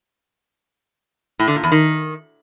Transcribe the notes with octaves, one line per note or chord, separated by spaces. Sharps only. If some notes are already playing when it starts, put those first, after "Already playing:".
A2
D3
A#2
E2
D#3